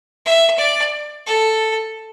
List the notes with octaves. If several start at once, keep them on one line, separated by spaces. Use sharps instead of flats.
E5
D5
A4